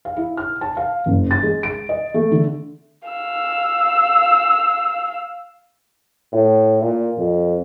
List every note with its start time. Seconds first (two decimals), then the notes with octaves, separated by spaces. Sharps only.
0.05 F5
0.16 E4
0.37 F6
0.61 A5
0.77 F5
1.06 F#1
1.31 A6
1.43 G#3
1.63 D7
1.89 D#5
2.14 A3
2.32 D3
3.08 F5 E6
6.32 A2
6.82 A#2
7.18 F2